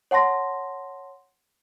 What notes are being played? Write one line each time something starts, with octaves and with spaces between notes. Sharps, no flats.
C#5 F#5 A5 C6 A#6